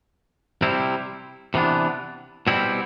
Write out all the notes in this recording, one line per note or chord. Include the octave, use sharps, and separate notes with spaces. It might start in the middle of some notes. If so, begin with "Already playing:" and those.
C3 G3 C4 E4
C3 E3 B3 D4
B2 G3 C4 E4